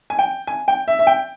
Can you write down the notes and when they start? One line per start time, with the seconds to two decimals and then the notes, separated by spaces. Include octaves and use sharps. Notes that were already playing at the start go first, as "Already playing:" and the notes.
0.10 G#5
0.19 G5
0.47 G#5
0.68 G5
0.88 E5
0.99 E5
1.07 G5